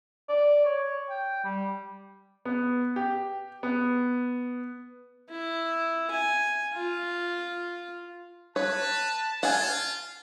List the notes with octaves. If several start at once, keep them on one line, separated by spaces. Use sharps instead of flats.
D5
C#5
G5
G3
B3
G4
B3
E4
G#5
F4
B4 C#5 A5
F4 F#5 G#5